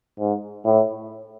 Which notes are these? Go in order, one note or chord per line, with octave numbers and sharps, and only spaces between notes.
G#2
A2